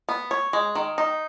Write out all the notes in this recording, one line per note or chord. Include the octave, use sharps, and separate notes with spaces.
B3
C#5
G#3
D#3
D#4